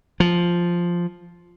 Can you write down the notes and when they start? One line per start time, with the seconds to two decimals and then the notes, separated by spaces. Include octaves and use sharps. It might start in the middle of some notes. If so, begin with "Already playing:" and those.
0.20 F3